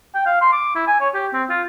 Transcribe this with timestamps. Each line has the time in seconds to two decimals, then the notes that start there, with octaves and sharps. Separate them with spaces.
0.15 G5
0.26 F5
0.41 C6
0.53 D6
0.75 E4
0.87 G#5
1.01 C#5
1.14 G4
1.34 C4
1.50 F4